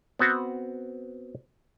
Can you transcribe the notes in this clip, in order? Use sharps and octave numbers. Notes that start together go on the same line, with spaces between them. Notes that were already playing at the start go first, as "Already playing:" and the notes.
B3 C4 F#4